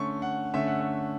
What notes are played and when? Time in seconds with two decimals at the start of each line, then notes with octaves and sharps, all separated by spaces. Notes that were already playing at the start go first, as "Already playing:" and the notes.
Already playing: D3 A3 C#4 C#6
0.22 F#5
0.54 D3 A3 C#4 E5
0.67 F#5
0.80 E5